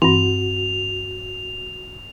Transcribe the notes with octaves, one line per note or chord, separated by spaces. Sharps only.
G2 E3 C4 F#4 F7